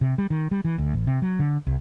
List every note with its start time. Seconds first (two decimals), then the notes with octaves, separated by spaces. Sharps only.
0.01 C3
0.18 G3
0.30 D#3
0.51 G3
0.64 E3
0.78 D2
0.94 A1
1.07 C3
1.22 F#3
1.39 D3
1.67 C2